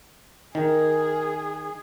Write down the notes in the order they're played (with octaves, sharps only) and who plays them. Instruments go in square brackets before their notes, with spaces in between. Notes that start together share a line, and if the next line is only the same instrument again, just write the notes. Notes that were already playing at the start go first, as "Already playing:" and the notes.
[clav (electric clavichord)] D#3 [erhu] G#4 [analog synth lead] A#4